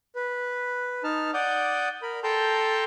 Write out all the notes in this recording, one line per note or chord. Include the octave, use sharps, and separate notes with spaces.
B4
D#4 A5 F6
D5 F#5 D6 D#6 G6
A#4 B5
A4 G5 A5 A#5 C6 G6